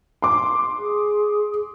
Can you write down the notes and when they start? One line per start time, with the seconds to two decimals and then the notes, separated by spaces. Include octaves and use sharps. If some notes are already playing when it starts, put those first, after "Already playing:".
0.22 C6 D6
0.78 G#4